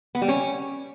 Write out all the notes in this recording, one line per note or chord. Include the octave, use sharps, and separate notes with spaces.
B3
G3
C#4